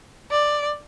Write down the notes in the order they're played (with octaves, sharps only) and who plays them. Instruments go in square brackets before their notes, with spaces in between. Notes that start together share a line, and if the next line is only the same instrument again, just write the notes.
[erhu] D5